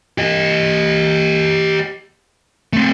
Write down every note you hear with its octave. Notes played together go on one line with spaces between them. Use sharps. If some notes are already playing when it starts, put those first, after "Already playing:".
G4 D#5
A3 C4